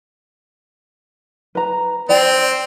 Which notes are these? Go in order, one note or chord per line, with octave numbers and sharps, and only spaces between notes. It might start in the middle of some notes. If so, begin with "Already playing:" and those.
B4 A#5
C4 D5 G5